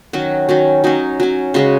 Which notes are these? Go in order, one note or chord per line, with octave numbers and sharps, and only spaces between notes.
D#3 F#3 C#4 F#4
D#3 F#3 C#4
F#3 C#4 D#4
F#3 C#4
C#3 G#3 C#4 F#4